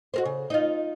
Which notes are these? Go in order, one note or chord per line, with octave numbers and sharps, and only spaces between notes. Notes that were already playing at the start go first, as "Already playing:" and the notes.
F#4 A#4 C5
C#3
D#4 F4